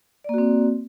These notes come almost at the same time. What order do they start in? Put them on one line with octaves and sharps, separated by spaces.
D5 A#3 F#4 C4